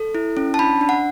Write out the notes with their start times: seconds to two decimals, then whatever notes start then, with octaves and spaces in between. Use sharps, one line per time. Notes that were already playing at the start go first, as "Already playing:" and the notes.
Already playing: A4
0.15 E4
0.37 C#4
0.54 A5
0.59 D4 B5
0.81 D4
0.89 F#5